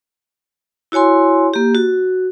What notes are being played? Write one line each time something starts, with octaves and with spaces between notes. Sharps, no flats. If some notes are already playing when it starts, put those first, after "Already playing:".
E4 F#4 C#5 G#5 C6
A#3 G4
F#4